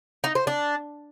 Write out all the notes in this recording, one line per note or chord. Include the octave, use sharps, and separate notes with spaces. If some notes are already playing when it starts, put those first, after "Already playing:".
D#4
C5
D4